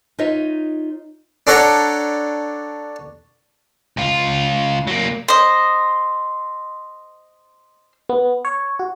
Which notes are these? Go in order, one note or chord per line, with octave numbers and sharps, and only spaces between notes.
D#4 F4 C#5 D#5 E5
D4 A4 C#5 F#5 A#5
C#2 F4
F#3 A#3
C5 D#5
B3
C#5
F#4